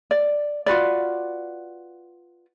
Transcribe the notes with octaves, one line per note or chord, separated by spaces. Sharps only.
D5
F4 F#4 B4 D5